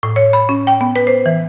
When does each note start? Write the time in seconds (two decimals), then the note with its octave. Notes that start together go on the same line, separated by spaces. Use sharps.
0.03 A2
0.16 C#5
0.33 B5
0.49 C#4
0.67 G5
0.81 B3
0.96 B4
1.07 C5
1.26 E3